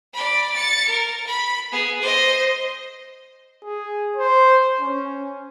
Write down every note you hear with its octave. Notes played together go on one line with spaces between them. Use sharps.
D5 B5
A6 C#7
A#4
B5
B3 G#4
C5 D#5
G#4
C5
C#4